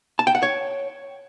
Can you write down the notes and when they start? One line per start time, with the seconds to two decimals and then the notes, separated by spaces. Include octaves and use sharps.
0.19 A5
0.27 G5
0.35 F#5
0.43 C#5